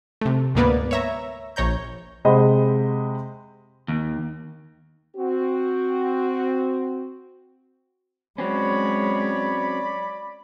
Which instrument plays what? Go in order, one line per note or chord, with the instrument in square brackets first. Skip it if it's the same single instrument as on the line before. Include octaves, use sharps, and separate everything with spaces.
[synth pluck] C3 A3
D2 G#2 A#3 B3 B4 D5
C#5 E5 A#5
A#1 C#5 A#5 G6
[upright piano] C3 G#3 C5 D#5 F#5 B5
[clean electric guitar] D#2
[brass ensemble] C4 F#4
[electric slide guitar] F#3 C4 C#4 [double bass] G#3 [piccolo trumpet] C#5 [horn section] D5 B5